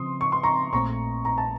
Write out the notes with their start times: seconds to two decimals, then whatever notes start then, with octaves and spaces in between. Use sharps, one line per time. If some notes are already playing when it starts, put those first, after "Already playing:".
Already playing: C#3 F3 C4 C6 D#6
0.21 C#6
0.32 C6
0.43 A#5 C#6
0.73 A#1 A#2 A3 C4 A#5 C#6
1.25 A#5
1.38 A5